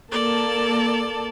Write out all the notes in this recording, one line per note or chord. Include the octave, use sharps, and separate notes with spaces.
A#3 A4 D5 A5